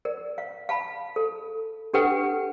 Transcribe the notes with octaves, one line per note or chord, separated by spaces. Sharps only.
A#4 D5
F5
F5 A5 B5
A4
D4 G4 A4 B4 F#5 G5
G4